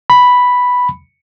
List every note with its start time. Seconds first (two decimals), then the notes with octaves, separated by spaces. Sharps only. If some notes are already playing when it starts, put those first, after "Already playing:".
0.10 B5